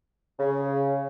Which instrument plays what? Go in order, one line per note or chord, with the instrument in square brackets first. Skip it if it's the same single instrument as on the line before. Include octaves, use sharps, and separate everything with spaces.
[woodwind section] C#3